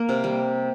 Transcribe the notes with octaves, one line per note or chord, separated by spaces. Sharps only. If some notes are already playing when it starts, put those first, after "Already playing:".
Already playing: A#3
C3
G3